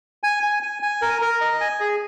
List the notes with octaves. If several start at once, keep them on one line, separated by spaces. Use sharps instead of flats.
G#5
G#5
G#5
G#5
A#4
A#4
D#5
G#5
G#4